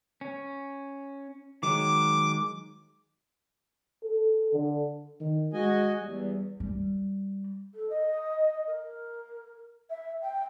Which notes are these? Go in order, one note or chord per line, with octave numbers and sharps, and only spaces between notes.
C#4
D#3 F#3 G#3 D6
A4
D3
D#3
G#3 F#4 D#5 G#5
E2 G3
G3
A4
D#5
A#4
E5
G5